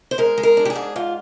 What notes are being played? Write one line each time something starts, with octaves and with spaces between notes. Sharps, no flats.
C5
G#3 A#4
G#3
A#4
D4
G4
G#4
G#2
G#2 F4